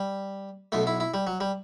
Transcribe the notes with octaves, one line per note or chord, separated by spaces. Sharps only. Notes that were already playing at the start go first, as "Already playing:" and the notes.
Already playing: G3
B1 B2 A3
E4
E4
G3
F#3
G3